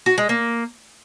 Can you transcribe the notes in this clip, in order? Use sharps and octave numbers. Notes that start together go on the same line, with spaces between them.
F#4
G#3
A#3